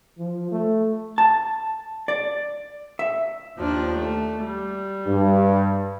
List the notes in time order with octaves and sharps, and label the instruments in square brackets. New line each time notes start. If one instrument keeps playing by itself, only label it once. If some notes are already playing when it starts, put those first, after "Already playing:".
[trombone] F3
A3
[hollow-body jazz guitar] A5
D5
E5
[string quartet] D#2 F3 D4
A3
G3
[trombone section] G2